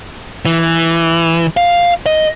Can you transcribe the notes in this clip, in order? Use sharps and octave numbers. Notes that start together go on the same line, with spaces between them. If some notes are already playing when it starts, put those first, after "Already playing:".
E3
F5
D#5